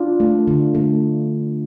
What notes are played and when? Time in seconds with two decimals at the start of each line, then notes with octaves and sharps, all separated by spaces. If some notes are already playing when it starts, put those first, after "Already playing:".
Already playing: D4 F4
0.20 A3
0.47 D3
0.75 A3